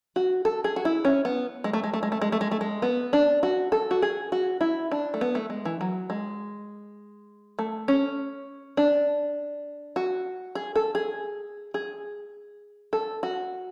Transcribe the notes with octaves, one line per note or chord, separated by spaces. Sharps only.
F#4
A4
G#4
F#4
E4
C#4
B3
G#3
A3
G#3
A3
G#3
A3
G#3
A3
G#3
A3
G#3
B3
D4
F#4
A4
F#4
G#4
F#4
E4
D4
A3
B3
A3
G#3
E3
F#3
G#3
A3
C#4
D4
F#4
G#4
A4
G#4
G#4
A4
F#4